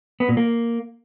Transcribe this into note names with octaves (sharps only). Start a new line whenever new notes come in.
B3
A#2
A#3